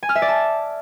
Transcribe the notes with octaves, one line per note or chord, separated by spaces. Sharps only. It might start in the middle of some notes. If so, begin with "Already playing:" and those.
G#5
F6
E5
D5
A5